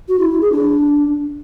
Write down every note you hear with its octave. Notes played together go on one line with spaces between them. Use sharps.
F#4
E4
E4
G#4
D4